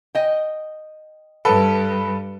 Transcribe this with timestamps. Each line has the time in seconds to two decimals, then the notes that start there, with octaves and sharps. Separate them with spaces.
0.15 D#5 G5
1.45 G2 A4 B4